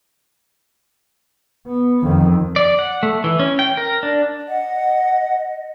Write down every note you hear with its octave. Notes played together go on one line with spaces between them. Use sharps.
B3
F2 D#3
D5
F#5
A3
E3
C#4
G5
A#4
D4
D#5 F#5